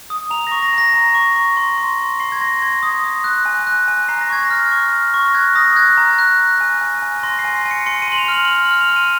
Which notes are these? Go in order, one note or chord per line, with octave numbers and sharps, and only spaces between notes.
D#6
A#5 F7
C#6 A#6
A#6
A#5 A#6
A#5
C#6
C#6
C6
C6
C6
C6 C7
G#6
C6 A#6
C6 G#6
D#6
D#6
F#6
G#5
F#6
G#5
A#5 C7
A#6
C#6 G#6
A#6
F6
C#6
F6
C#6
A#6
F#6 G#6
D#6 A#6
F#6 G#6
A#5
F#6
F#6
G#5
G#5
G#5
C6 A#6
C7
G#5
C7
G#5
C#7
C6 C#7
D#7
C6 F#7
F7
F6
F#7
F#7
F6 F7
F#7
F6
F7
C6 D#7